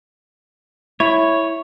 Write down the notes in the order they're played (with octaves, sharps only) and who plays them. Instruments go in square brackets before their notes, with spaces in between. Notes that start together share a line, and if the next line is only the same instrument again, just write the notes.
[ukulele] E4 [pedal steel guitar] C#5